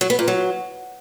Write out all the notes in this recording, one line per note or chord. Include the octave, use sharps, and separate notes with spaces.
F#3
B3
A#2
F#3